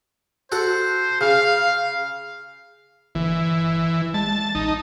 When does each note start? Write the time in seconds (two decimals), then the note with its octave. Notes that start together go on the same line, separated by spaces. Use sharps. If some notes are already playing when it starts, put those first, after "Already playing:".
0.52 F#4 A4 C5 F#5
1.21 C#3 F5
3.15 G1 E3
4.14 G#3 A5
4.55 A#1 D#4